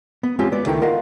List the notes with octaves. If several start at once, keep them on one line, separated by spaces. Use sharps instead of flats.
B3
G#3 C4 C#4 F4 G4
B3 D5
C#2 D#3 A3 E4 G5
F4 A#4 D#5 F5 F#5